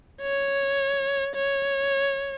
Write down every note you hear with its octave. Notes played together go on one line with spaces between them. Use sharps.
C#5
C#5